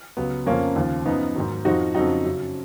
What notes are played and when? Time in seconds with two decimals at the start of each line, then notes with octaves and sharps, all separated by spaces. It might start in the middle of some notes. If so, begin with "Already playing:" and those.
0.17 C#2 C#3 F#3 B3
0.46 F2 C#3 F3 A#3 C#4
0.76 D#2 C#3 F3
1.06 F#2 F3 B3 D#4
1.36 G#2 D#3 F#3
1.65 F2 F3 D#4 F#4
1.95 F2 C#3 F#3 D#4 F#4
2.25 F#2 C#3 F#3